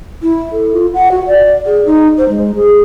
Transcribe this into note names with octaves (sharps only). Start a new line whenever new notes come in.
E4
A4
F4
F#5
F#4
D5
G#4
D#4
C5
G#3
G#4